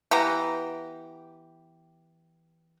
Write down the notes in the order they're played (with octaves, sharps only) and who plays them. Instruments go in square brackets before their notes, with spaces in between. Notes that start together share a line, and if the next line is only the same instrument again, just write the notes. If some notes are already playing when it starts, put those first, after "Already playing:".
[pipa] E3 B3 G4 A#5